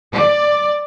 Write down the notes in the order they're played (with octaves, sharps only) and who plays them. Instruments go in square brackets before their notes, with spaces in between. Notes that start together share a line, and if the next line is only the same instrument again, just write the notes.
[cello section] D5